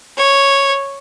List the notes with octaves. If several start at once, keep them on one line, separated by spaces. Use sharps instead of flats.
C#5